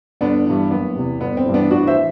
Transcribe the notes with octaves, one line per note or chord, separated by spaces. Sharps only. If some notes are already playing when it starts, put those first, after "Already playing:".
G1 B3 D4
G2 E3
F#1 B3
E2 C3
G1 B3
C4
G2 E3
B3 D4
A1 D4 F#4
C5 E5
E3